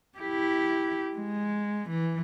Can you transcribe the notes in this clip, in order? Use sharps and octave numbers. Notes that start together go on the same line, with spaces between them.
E4 G4
G#3
E3